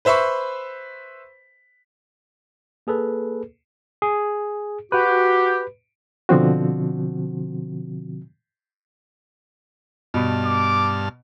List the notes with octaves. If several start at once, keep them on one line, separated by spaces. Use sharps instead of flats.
B4 C5 E5 B5 C#6
A#3 G#4 A4 B4
G#4
F#4 G4 B4
B2 D3 F3 C4 F#4
G2 B2 A5 B5 F6
D6